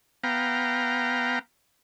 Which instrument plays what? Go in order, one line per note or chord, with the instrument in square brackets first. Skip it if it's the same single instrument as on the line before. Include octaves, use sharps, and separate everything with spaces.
[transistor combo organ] B3 F5 G5 A#5